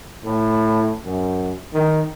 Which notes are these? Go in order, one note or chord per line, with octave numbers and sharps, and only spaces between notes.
A2
F#2
D#3